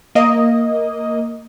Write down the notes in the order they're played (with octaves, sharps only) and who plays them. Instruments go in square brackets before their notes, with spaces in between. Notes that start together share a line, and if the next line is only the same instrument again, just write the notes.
[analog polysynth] A#3 D#5